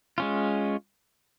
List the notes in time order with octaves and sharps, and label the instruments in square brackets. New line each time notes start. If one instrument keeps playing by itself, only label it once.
[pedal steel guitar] G#3 C#4 F4